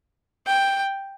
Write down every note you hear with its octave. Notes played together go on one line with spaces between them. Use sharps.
G5